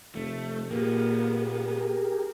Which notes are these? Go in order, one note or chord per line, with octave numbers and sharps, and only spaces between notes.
F1 A3
A#2 A#3 B3 G4 G#4 A#4